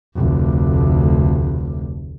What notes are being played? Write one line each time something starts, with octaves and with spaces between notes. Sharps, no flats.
F1 D2